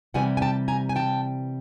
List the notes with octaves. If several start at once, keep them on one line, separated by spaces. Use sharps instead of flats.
C3 E3 G3 F#5 G#5
G#5
G5 A5
G#5 A#5
G#5
G5 A5